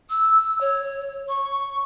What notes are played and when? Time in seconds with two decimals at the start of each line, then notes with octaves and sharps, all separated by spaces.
0.10 E6
0.61 C#5
1.29 C#6